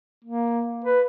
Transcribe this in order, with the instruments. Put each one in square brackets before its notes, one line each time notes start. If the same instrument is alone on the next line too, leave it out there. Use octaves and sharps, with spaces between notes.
[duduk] A#3
B4